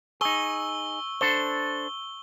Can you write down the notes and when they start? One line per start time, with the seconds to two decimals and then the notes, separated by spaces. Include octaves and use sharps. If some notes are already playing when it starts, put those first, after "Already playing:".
0.21 D#4 G#4 C#6 E6 G7
1.21 D4 A4 C5 G7